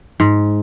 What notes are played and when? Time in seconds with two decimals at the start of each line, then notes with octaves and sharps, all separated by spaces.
0.20 G#2